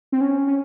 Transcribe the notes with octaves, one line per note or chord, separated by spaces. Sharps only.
C4
C#4
C#4